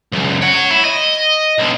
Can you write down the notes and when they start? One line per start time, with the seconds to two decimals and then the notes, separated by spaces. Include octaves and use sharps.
0.12 C#2 F#2
0.41 C#5 F#5
0.71 E4
0.85 D#5
1.58 B1 D3